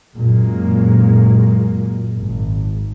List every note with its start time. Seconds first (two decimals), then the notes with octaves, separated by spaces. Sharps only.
0.16 F#2 A#2 G#3 A#3
2.18 G#1